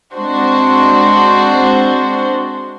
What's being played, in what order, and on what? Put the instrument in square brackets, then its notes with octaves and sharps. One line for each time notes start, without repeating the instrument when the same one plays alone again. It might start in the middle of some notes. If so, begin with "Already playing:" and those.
[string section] G#3 C4 D4 F#4 C5